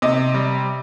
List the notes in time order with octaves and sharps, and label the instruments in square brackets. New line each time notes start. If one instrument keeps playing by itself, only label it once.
[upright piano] C3 D#5
G3